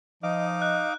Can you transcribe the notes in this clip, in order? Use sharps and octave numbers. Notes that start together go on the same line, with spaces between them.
F3 D#4 D#5 F5 D6
F#6